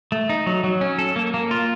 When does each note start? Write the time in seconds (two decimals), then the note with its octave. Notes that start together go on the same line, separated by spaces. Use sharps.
0.12 A3
0.29 D#4
0.46 F#3
0.64 F#3
0.81 C#4
0.99 A4
1.16 A#3
1.34 A#3
1.51 F4